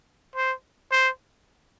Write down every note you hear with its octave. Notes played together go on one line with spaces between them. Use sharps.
C5
C5